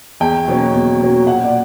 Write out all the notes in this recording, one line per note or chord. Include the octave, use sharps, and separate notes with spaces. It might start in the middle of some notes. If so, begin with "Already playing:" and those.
E2 G5
B2 F#3 A#3 C#4
E2
B2 F#3 A#3 C#4
A#2 F#5
D5